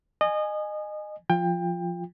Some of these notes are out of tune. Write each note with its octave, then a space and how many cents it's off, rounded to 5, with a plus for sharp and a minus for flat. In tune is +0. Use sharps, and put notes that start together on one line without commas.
D#5 -25 G#5 +0
F3 +0 F4 +0 G5 +25